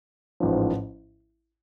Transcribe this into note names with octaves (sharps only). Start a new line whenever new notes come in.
A1 G#2 F3